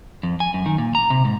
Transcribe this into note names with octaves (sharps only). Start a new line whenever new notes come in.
F2
G#5
F#2
D#3
A#2
A#5
C3
G#2